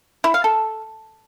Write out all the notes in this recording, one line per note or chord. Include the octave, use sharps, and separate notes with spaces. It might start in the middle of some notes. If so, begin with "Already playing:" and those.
E4
F5
A4